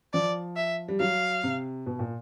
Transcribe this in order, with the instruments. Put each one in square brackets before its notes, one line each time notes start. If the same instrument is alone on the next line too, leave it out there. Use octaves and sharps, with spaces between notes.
[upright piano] F3 [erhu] D5
[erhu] E5
[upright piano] G3
[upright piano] F#3 [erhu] F5
[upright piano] C3
B2
A#2